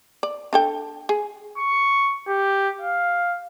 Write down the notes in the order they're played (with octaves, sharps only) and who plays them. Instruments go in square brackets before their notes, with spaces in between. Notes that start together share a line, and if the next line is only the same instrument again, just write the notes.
[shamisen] D5
D4 A4 G5
G#4
[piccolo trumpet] C#6
G4
F5